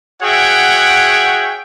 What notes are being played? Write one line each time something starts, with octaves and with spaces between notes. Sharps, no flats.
F#4 G#4 C#5 E5 F#5 G5